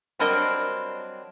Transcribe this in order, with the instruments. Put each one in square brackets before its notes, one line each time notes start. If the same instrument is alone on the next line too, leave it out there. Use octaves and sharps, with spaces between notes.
[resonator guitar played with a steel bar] F#3 G3 C4 D4 A#4 D#5